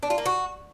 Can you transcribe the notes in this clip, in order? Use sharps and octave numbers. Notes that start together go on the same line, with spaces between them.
D4
F4
A#3
F#4